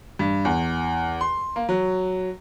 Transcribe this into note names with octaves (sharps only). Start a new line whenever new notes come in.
G2
E2
C6
A#3
F#3